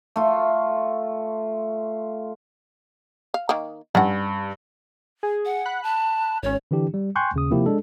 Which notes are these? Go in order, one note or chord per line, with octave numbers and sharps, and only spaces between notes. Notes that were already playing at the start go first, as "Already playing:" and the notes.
A3 F4
F5
D#3 A#3
G2 C#4 F#5
G#4
F#5
B5 F#6
A5
G#1 C#4 C#5
D3 E3 D4 G4
G3
G5 G#5 C6 C#6 F#6 G6
D#2 C#3 D#6
C3 F3 A#3 E4 G4
G#3 D4 A4